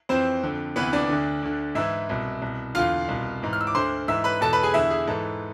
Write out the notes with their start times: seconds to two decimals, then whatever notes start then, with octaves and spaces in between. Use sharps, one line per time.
0.09 F2 E3 C4 C5
0.43 F2 D3
0.76 D2 C3 E3 B3 B4
0.93 D4 D5
1.10 D2 D3
1.43 D2 D3
1.75 G#2 E3 E4 E5
2.09 C2 B2
2.42 C2 B2
2.75 E2 D3 F4 F5
3.08 C2 B2
3.42 G#2 E3
3.53 F6
3.61 E6
3.67 D6
3.75 D2 D3 C5 C6
4.08 G#2 E3 E5 E6
4.24 B4 B5
4.41 E2 B2 A4 A5
4.53 B4 B5
4.63 G#4 G#5
4.74 E2 D3 E4 E5
4.90 G#4
5.07 G#2 E3 A4